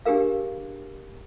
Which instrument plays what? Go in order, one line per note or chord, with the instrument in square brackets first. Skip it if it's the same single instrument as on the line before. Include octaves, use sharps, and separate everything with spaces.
[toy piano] D4 G4 G#4 A#4 F5